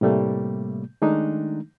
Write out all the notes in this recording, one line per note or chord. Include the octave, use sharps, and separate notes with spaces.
A2 C3 G3 A3 A#3
D#3 G#3 A3 D4 D#4